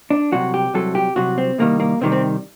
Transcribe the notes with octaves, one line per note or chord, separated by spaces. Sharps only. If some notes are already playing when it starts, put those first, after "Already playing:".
D4
C2 C3 F#3 F#4
G4
C2 C3 F#3 A4
G4
C2 C3 F#3 F#4
C4
C2 C3 D#3 G3 A#3
A#3
C2 C3 D#3 G3 C4
C4